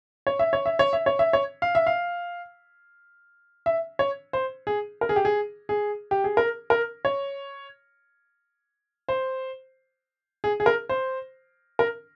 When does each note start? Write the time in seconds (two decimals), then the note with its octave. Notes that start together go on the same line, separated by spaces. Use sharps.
0.27 C#5
0.39 E5
0.53 C#5
0.66 E5
0.79 C#5
0.93 E5
1.06 C#5
1.19 E5
1.33 C#5
1.62 F5
1.75 E5
1.87 F5
3.66 E5
3.99 C#5
4.33 C5
4.67 G#4
5.01 A#4
5.09 G#4
5.16 G4
5.25 G#4
5.69 G#4
6.11 G4
6.24 G#4
6.37 A#4
6.70 A#4
7.05 C#5
9.09 C5
10.44 G#4
10.60 G#4
10.66 A#4
10.89 C5
11.79 A#4